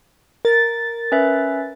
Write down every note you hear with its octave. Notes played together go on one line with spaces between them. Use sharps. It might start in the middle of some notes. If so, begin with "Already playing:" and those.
A#4 A6
C#4 B4 E5